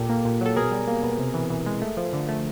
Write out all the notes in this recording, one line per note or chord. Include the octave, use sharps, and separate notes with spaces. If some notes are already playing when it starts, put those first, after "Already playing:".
Already playing: A#2 G4 A4
A#3
A#2
F#3 A4
B2 G#4 A#4
G3
A#3
B2
C3
E3
E3
G#3
A3
F3
D3
A3